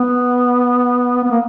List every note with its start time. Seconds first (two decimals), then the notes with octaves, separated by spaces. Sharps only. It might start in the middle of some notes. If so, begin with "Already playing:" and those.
Already playing: B3
1.24 B3
1.31 A#3